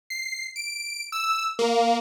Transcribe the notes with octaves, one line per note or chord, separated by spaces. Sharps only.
C7
D7
E6
A#3